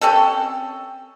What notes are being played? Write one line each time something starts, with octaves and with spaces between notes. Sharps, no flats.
C4 C#4 G4 A4